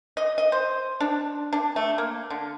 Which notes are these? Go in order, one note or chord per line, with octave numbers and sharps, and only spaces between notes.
D#5
D#5
C5
D4
D4
A3
A#3
D3